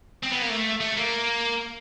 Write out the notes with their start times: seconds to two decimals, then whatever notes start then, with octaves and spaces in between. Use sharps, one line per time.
0.23 C4
0.32 B3
0.42 A#3
0.50 A3
0.81 A3
0.97 A#3